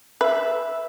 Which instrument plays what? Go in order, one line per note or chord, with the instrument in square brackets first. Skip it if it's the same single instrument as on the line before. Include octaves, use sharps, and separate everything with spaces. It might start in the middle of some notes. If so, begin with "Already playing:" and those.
[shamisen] B4 [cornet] E5